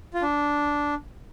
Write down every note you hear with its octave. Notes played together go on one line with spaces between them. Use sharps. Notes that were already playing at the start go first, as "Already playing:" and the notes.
F4
D4